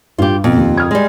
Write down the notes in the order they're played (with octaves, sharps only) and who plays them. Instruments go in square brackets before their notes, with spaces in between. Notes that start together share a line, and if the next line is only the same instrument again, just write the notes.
[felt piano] G2 [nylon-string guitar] F4 G4
[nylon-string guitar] F2 [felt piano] B2
[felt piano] D#2
D#6 F6 G#6
[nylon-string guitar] G3 G#3